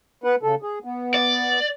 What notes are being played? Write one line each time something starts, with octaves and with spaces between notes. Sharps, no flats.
B3 B4 F#5
C#3 A4
G#4
B3
D5